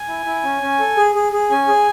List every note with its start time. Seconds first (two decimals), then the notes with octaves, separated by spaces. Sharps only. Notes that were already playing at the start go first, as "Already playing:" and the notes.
Already playing: G#5
0.08 E4
0.26 E4
0.43 C#4
0.62 C#4
0.79 A4
0.97 G#4
1.15 G#4
1.32 G#4
1.50 C#4 G#5
1.68 G#4